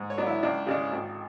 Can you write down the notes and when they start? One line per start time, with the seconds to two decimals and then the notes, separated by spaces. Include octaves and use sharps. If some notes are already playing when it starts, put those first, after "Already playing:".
Already playing: G#2
0.10 C#5
0.17 F#3 B3 D4
0.27 E4
0.43 C#2 D4
0.67 C#3 G#3 D4
0.92 G#1